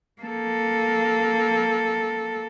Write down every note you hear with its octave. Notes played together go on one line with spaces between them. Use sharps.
A#3 A4